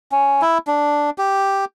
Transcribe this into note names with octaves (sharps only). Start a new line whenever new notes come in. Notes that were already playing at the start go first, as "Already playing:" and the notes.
C#4
E4
D4
G4